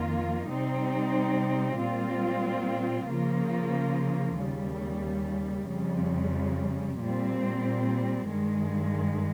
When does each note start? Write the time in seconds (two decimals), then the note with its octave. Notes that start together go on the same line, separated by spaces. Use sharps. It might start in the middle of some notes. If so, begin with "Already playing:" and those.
Already playing: F2 D#3 A#3 F4
0.50 C3 G3 C4 D#4
1.79 A#2 G3 C4 F4
3.09 C#3 F3 A#3 F4
4.39 D#2 C#3 G3
5.69 F2 C#3 G3
6.99 A#2 G3 C4
8.30 G2 D#3 G#3